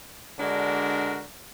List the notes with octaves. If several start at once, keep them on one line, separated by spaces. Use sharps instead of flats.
D3 G#3 D4 F#4 A#4